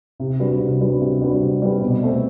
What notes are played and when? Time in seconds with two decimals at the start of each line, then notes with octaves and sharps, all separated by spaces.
0.20 C3
0.40 G3 D4 F#4 B4
0.60 C3
0.81 G3 D4 F#4 B4
1.01 C3
1.21 G3 D4 F#4 B4
1.41 C3
1.62 G3 D4 F#4 B4
1.82 B2
2.03 A3 C4